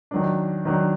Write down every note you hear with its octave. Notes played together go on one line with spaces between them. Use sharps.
D#3 F#3 D4
D#3 F#3 D4